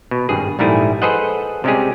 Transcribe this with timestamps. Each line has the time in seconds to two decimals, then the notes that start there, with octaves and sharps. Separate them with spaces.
0.11 B2
0.29 G#1 G2 G#4
0.59 A#1 G#2 G3 A3 E4 G#4
1.02 G#4 A4 B4 C5 D#5 F#5
1.64 C3 G3 G#3 C#4 G4 G#4